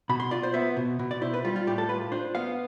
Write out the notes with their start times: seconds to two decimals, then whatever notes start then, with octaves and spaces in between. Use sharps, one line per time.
0.09 B2 B5
0.20 C6
0.31 F4 D5
0.43 C5
0.54 B3 E5
0.77 B2
0.99 B2
1.11 D5
1.22 E4 C5
1.34 B4
1.45 G3 F4
1.56 F4
1.67 A2 G4
1.78 A4
1.89 F4 B4
2.12 D4 C5
2.35 B3 F5